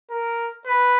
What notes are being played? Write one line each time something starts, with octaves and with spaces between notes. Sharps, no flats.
A#4
B4